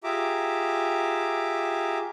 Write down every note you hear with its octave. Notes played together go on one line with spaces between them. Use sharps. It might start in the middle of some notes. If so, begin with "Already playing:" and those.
F4 G4 G#4 E5 A#5 D6